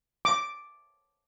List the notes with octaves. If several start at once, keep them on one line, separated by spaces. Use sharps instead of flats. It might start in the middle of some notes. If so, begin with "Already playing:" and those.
D6